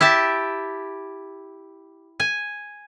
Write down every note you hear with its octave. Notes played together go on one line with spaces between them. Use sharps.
E4 G4 E5 A5
G#5